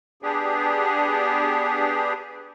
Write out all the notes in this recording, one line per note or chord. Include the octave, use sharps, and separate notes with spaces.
B3 D4 G4 G#4